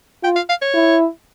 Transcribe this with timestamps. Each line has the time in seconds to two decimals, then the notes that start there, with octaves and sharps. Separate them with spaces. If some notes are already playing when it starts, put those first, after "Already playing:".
0.23 F4 G5
0.36 F5
0.49 F5
0.62 C#5
0.74 E4